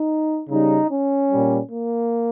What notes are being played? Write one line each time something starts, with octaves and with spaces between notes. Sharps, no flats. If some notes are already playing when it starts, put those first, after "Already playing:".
Already playing: D#4
C#3 G3 D#4
C#4
A#2 G3
A#3